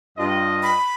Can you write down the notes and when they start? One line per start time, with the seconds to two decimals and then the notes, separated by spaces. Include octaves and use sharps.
0.18 G2 F4 D#5
0.63 B5